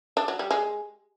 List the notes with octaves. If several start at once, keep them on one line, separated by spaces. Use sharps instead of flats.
D4
F#3
G3
G#3